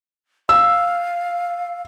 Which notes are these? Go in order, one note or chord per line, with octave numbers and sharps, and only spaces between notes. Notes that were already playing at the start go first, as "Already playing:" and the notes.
F5 E6